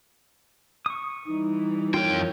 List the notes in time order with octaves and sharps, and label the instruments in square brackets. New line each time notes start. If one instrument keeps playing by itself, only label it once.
[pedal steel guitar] C#6 D#6
[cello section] E3 G3 [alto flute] D#4
[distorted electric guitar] F2 G5 [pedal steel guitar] F4 A#4 C#5